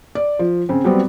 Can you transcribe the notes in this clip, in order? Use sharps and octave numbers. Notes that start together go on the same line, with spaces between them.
D5
F3
C#3 C4
F#3 G3 B3 C4